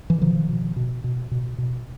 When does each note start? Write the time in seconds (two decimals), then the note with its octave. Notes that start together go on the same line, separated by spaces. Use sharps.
0.10 E3
0.22 B2 D#3 F3
0.49 B2
0.76 B2
1.04 B2
1.31 B2
1.58 B2